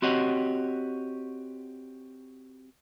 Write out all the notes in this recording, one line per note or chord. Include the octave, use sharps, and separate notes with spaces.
C4 F#4 G4 C#5 D#5 F#5